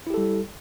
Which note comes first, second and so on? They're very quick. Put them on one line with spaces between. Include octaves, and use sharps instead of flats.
E4 G4 A4 G3